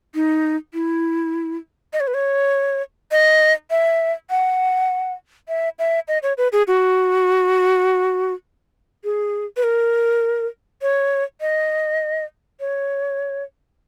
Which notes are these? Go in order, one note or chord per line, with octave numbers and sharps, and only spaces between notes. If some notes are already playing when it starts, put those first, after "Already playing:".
D#4
E4
D#5
C#5
B4
C#5
D#5
E5
F#5
E5
E5
D#5
C#5
B4
G#4
F#4
G#4
B4
A#4
C#5
D#5
C#5